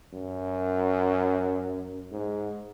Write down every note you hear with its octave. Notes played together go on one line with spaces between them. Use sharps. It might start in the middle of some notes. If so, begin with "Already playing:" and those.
F#2
G#2